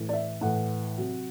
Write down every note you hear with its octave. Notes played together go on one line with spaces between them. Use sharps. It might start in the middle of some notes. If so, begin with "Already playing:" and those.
Already playing: A2 E3
D5
E5
A2 E3 F#5
C3 F#3